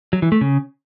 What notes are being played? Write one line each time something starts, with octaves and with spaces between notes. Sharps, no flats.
F#3
E3
A3
C#3